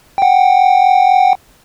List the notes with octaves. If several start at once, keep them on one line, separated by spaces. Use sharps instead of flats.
F#5 G5